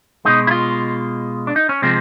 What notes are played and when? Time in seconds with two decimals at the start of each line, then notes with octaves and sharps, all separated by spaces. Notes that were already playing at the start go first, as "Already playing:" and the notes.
0.25 B2 G#3 D#4
0.47 E4
0.51 F4
1.47 D4
1.56 D#4
1.69 C#4
1.82 C3 F3 G#3 C4